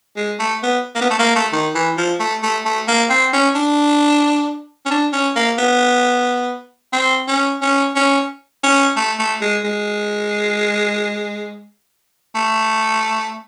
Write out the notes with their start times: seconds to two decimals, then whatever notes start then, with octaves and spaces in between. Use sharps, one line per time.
0.17 G#3
0.39 A3
0.63 B3
0.95 A#3
1.01 B3
1.10 A3
1.19 A#3
1.36 A3
1.53 D#3
1.75 E3
1.97 F3
2.20 A3
2.43 A3
2.65 A3
2.88 A#3
3.10 C4
3.33 C#4
3.55 D4
4.85 C#4
4.91 D4
5.13 C#4
5.36 A#3
5.58 B3
6.93 C4
7.28 C#4
7.62 C#4
7.96 C#4
8.63 C#4
8.97 A3
9.19 A3
9.41 G#3
9.64 G#3
12.35 A3